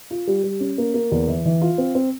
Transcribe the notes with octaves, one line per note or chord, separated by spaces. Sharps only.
F4
G3
G3
C#4
A#3
A#3
E2
E3
E3
F4
C4
C4